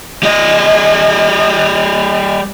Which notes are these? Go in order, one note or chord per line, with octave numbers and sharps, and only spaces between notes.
G3 D#5